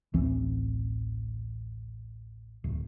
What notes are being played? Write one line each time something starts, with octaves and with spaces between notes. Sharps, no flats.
A1 D2 E3 C4
D1